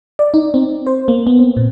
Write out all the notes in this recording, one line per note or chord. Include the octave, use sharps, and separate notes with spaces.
D5
D#4
C4
C5
A#3
B3
C4
A#2